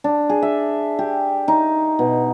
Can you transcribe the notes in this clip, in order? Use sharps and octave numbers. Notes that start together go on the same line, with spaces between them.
D4
G#4
E5
G4
D#4
B2